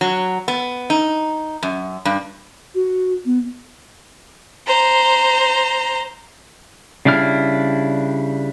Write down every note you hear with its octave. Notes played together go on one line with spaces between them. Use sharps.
F#3
B3
D#4
F#2
G2
F#4
B3
C5 A#5
C#3 G3 D4 E4 F6